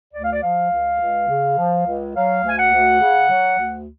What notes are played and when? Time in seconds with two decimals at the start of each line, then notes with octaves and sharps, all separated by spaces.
0.13 D2 D5
0.24 F5
0.32 D5
0.42 F3 F5
0.71 C#2
1.00 C#2
1.29 C#3
1.57 F3
1.86 C#2
2.15 F#3 F5
2.44 D2 G#5
2.58 F#5
2.72 D2
3.00 C#3
3.30 F#3
3.58 D2